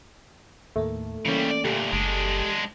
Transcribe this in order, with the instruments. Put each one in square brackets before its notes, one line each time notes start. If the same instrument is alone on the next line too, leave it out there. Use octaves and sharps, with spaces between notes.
[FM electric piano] D#2 A2 A#3 [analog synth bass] A3
[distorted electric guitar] C#3 G3 [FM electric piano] E3 A#3 C#4
[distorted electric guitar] D5
[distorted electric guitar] D2 A#2 [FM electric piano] G4 A4
[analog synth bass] F#1 [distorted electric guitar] G#3 D4